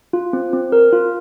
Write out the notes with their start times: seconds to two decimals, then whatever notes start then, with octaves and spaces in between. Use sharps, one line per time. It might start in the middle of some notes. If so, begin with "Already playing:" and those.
0.13 F4
0.33 C4
0.53 C4
0.72 A#4
0.92 F4